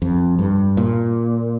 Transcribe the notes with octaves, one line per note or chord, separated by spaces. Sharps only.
F2
G2
A#2